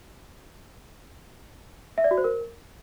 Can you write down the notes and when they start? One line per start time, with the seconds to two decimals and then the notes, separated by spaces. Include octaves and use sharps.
1.98 E5
2.04 D5
2.11 F#4
2.18 C5
2.24 A#4